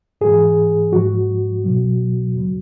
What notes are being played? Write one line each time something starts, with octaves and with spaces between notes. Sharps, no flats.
G#2 E3 G#4
G#2 F3 F#4
C2 B2 F#3
D#2 C#3 F#3